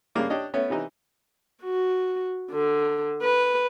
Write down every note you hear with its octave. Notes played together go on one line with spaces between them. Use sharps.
G2 C#3 A#3 C#4 D5 D6
D4 G4 C#5 D#5
A3 B3 C#4 C#5
C3 E3 D#4
F#4
D3
B4